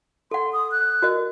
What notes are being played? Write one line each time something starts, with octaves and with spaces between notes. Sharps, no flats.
A4 F#5 C6
D#6
F#6
F#4 A#4 D#5